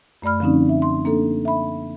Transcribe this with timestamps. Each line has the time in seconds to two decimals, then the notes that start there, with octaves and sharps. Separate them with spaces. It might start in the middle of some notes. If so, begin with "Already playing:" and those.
0.22 F#2 A3 D5 B5 F6
0.40 D3 F3 C4 C#4 D#4
0.69 E5
0.82 C6
1.05 A#3 D4 A4
1.45 E5 B5